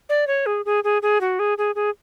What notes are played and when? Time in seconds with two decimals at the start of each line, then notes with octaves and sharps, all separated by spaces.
0.09 D5
0.27 C#5
0.46 G#4
0.65 G#4
0.84 G#4
1.02 G#4
1.21 F#4
1.39 G#4
1.58 G#4
1.75 G#4